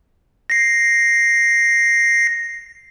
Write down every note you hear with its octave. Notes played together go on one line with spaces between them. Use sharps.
A#6 C7